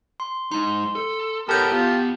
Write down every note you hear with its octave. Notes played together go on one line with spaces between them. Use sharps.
C6
G#3 D#4 C6
A4
B3 G4 A4 A#4 C#5 A5 G6
E2 B3 F4 G4